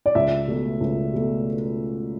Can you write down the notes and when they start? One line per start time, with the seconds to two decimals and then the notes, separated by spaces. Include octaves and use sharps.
0.06 D5
0.15 C#2 E5
0.48 B2 A3
0.80 C#2
1.14 B2 A3